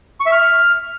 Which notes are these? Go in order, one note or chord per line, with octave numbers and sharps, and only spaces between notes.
C#6
E5
F6